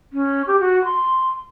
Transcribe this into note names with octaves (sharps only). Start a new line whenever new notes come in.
C#4
G4
F#4
C6